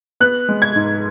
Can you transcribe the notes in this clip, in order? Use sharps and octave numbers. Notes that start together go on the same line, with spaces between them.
B3 F#6
G#3
G#6
G#2